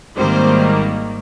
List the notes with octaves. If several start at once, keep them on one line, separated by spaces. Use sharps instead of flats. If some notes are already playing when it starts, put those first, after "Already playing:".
G#1 G#2 D#3 G3 A#3 C4 C5